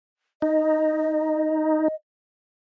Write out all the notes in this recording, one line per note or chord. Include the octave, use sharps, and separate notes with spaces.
D#4 D#5